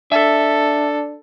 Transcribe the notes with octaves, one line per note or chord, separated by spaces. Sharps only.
D4 A4 E5